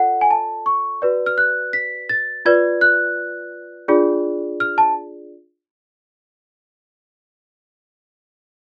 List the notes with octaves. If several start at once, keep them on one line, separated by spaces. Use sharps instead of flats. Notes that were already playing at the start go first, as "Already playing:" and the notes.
Already playing: F4 A4 D5 F#5
G#5
A5
C#6
F#4 B4 D5
F6
F#6
B6
A6
F4 B4 D5 G#6
F#6
D4 F4 G#4 D5
F6
A5